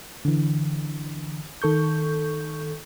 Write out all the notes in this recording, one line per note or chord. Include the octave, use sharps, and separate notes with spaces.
D3 E3
D#3 A4 C#6 G6